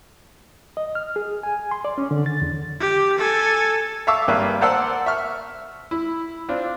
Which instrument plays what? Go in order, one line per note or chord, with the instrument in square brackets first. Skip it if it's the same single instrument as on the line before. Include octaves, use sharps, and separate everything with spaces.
[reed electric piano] D#5
F6
G#4
G#5
C6
D5
C#4
D3
A6
E2
[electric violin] G4
A4 G#5
[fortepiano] E5 F5 A5 C#6 D6 E6
G#1 G2 A#3 B4 E5
A#4 C5 D5 F#5 A5 E6
E5 C#6 F6
E4
C4 D4 F4